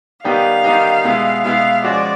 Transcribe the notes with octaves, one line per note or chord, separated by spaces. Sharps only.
D#3 G3 B3 D#4 G4 F5
D#3 G3 B3 D#4 G4
B2 G#3 B3 E4 G#4
B2 G#3 B3 E4 G#4 F5
F3 G#3 C#4 F#4 D5